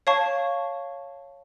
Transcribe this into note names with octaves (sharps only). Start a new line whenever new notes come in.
C#5 F5 A5 C#6